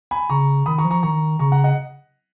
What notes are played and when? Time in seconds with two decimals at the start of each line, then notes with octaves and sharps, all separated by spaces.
0.11 G#5 B5
0.29 C#3 A#5 C#6
0.66 D#3 B5 D#6
0.78 A#5 C#6
0.85 F3
0.90 A#5 C#6
1.03 D#3 A#5 C#6
1.39 C#3 A#5 C#6
1.52 F#5 A#5
1.64 D#5 F#5